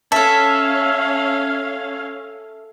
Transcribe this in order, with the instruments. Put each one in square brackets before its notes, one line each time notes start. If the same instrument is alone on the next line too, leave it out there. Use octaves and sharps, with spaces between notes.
[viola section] C#4 F5 [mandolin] A4 E5 [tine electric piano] A5